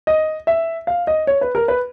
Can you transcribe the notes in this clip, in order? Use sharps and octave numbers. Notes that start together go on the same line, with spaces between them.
D#5
E5
F5
D#5
C#5
B4
A#4
B4